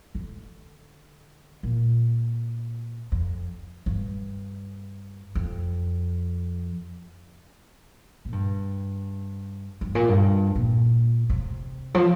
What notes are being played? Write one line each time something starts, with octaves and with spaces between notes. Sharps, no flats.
D3
A#2
F2
G2
F2
A#2
G2
G2
A#2
G2
A#2
C3
F3